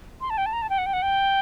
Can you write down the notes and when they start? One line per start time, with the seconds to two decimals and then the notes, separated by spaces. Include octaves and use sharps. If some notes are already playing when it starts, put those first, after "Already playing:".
0.21 C6
0.30 A5
0.38 G5
0.46 A5
0.53 A#5
0.62 A5
0.70 G5
0.78 F#5
0.86 G5
0.93 F#5
1.02 G5